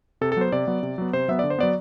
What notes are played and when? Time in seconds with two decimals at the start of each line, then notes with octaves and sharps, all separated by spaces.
0.21 C3 A4
0.32 A4
0.37 F#3 B3 C5
0.52 C3 D5
0.67 F#3 B3
0.83 C3
0.98 F#3 B3
1.13 C3 C5
1.28 F#3 B3 E5
1.39 D3 D5
1.50 C5
1.58 F#3 B3 D5